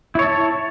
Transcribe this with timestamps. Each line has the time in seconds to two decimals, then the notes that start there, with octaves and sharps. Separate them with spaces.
0.15 E4
0.19 C#5
0.23 A5